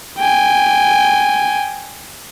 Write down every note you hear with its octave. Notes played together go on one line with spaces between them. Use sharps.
G5 G#5